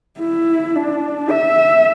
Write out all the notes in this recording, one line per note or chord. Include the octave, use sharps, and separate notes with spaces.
E4
D4
E5